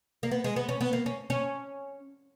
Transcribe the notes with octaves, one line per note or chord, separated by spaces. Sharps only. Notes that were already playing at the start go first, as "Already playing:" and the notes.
A#3
B3
G#3
B3
C#4
B3
A#3
C#4
C#4